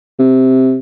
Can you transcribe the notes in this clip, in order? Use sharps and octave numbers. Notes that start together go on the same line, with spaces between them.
C3